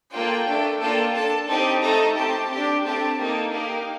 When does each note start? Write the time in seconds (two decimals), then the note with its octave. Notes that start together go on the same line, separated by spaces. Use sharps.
0.13 A#3 F4 A4 G5
0.46 A3 D4 A4
0.80 A#3 D4 F4 A4 G5
1.14 D4 A4 A5
1.48 C4 D#4 G4 A5
1.82 A3 D#4 A4 A#5
2.16 C4 G4 A5
2.50 D4 G4
2.84 A3 C4 G4 A5
3.18 A#3 D#4 A4
3.52 A#3 D#4 G4 F5